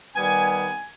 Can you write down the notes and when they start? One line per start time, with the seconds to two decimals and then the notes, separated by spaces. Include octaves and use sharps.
0.15 D#3 G3 B3 G#5
0.48 G#5